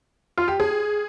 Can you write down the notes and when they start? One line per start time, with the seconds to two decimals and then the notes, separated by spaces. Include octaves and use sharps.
0.37 F4
0.48 G4
0.60 G#4